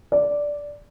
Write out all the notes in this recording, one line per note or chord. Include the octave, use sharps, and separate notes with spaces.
D5